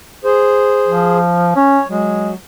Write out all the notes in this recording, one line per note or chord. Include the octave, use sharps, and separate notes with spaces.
G#4 C5
F3
C#4 C#5
F#3 G#3